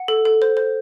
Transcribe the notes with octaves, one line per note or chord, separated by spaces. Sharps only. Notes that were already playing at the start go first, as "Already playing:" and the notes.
Already playing: F#5
A4
A4
C5
C5